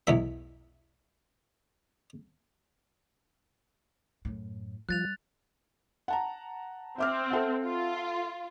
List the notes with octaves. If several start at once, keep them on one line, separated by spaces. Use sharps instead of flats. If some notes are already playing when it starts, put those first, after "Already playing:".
B1 E2 E5
F#2 A2
F3 G3 F#6 A6 F7
F#5 A5 A#5
C4 E5 D6 F6
A4 E5 F#5
F4